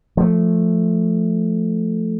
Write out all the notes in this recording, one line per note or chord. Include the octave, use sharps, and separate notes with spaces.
F3 A3